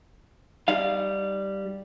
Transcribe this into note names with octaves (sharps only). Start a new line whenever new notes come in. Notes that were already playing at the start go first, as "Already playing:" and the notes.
G3 D#4 F5